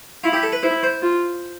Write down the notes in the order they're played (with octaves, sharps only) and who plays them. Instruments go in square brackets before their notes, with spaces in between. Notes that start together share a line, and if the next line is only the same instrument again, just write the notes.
[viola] E4 [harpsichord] F4
[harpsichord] G4
A4
B4
[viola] E4 [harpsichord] C5
[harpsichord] C5
[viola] F4